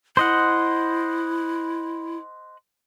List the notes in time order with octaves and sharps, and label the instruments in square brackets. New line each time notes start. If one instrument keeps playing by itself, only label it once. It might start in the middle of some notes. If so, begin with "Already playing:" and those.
[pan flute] E4 [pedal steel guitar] C5 D#5 F#5